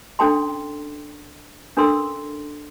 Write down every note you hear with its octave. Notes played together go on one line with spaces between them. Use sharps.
C#4 D4 A4 G5 A5 C6
C#4 D4 A4 A#4 C6 E6